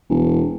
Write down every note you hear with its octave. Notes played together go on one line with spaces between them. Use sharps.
E1